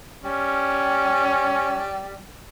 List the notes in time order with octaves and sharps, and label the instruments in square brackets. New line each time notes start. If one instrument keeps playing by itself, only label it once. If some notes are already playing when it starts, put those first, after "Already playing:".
[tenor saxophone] G3 [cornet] C#4